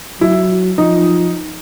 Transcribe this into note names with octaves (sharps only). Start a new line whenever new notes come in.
F#3 E4
F3 D#4